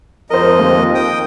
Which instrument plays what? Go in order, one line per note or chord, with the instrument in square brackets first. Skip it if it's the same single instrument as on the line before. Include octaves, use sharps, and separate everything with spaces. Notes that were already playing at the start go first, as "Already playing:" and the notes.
[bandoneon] F2 D#5 [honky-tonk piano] A#4 C5
[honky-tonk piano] D#2
[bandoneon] G5 D#6